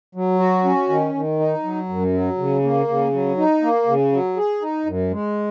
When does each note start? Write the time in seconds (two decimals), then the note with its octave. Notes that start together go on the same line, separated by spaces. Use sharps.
0.15 F#3
0.39 F#4
0.65 C#4
0.89 D#3
1.14 D#3
1.39 D#4
1.63 F#3
1.89 F#2
2.13 F#3
2.38 C#3
2.63 A#3
2.88 C#3
3.13 F#3
3.37 D#4
3.62 A#3
3.87 C#3
4.12 F#3
4.37 G#4
4.62 D#4
4.86 F#2
5.11 G#3